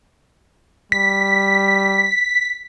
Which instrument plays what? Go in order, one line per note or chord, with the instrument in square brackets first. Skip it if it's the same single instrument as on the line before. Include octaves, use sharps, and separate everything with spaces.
[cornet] G3 [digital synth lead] B6